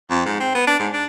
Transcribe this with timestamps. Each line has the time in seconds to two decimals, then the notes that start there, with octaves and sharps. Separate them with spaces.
0.10 F2
0.26 G#2
0.40 C4
0.55 B3
0.67 D4
0.79 G#2
0.93 D4